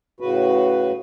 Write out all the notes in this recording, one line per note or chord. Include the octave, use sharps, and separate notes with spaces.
A2 C#3 F#4 B4